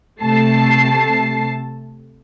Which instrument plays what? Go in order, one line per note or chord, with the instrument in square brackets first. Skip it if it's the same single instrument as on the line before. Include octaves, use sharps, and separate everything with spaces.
[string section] C3 A3 A5 C7